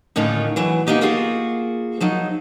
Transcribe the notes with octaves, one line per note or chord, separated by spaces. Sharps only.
D#2 A2 D3 C#4 D#4 F4
E3 F#3 E4
A#3 B3 D4 D#4 G4
A#3 F4 F#4 G#4
F3 F#3 D#4